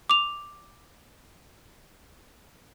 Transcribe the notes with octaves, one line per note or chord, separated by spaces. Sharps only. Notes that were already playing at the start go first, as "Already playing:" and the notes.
D6 F7